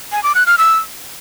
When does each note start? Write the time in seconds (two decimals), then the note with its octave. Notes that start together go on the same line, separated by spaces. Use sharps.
0.12 G#5
0.23 D6
0.35 F#6
0.46 F6
0.58 E6